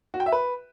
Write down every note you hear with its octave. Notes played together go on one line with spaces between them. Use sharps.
F#4
G5
E5
B4